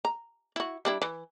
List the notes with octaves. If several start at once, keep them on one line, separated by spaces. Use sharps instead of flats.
A#5
E4 F#4
G3 D4 E4
E3